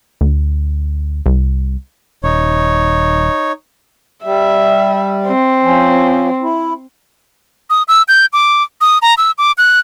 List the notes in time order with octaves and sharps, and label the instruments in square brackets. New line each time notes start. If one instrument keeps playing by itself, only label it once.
[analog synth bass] D2
C2
[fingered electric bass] D#1 [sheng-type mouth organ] D#4 C#5
[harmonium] G3 [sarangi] E5
[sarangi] C4
[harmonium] F3 C#4
E4
[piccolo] D#6
E6
G6
D6
D#6
A#5
E6
D6
F#6